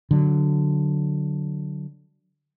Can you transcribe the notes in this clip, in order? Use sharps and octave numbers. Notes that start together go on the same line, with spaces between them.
D3 F#3